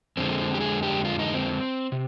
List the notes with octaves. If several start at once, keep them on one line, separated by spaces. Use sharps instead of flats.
F2 D3 G#3 C4
G4
G#4
G4
F4
D#4
C4
C3